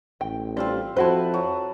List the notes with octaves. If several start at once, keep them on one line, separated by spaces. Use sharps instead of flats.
A1 G5
G3 C4 D4 F4 A4 C5
F2 E4 F#4 B4 C5 A5
F#3